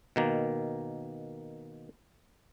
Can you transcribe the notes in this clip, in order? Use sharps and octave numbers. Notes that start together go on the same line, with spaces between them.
B2 D#3 A#3